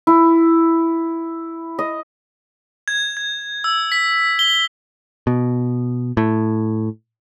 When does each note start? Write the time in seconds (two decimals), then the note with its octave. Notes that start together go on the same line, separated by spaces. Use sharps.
0.07 E4
1.79 D#5
2.88 G#6
3.17 G#6
3.64 E6
3.92 B6
4.39 G7
5.27 B2
6.17 A2